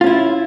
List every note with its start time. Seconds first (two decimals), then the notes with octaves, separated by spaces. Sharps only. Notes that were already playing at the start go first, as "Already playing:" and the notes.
0.01 F4
0.04 C#4
0.06 E4